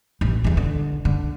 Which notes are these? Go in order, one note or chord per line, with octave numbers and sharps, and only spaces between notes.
A1
E2 C3
D3
D3